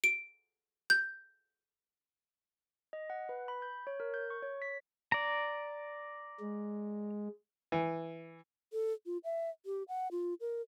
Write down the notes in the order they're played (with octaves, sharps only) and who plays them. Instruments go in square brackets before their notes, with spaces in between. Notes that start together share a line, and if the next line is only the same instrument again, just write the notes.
[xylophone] D7
G6
[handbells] D#5
F#5
B4
B5
G6
C#5
A#4
G6
C#6
C#5
B6
[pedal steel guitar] D5 A#5
[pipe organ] G#3
[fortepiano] E3
[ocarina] A4
F4
E5
G4
F#5
F4
A#4